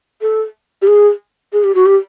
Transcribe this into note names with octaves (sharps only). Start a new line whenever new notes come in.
A4
G4
G#4
G#4
G4
F#4
G4